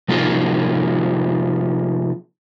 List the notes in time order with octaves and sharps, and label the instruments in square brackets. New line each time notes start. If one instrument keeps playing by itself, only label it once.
[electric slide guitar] C3 F3 A#3 D#4 F4 G#4